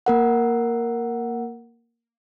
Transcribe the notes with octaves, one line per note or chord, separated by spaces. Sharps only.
A#3 A#4 F#5